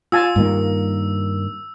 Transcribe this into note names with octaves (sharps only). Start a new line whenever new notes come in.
F4 G#5 A5 E6
G2 D#3 A#3